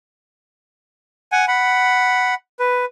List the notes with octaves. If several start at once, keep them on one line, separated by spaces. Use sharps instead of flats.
F#5 G#5
F#5 B5
B4